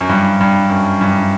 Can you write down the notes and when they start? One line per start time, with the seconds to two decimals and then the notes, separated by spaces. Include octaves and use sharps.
0.01 F#2
0.09 G2
0.40 G2
0.70 F#2
1.01 G2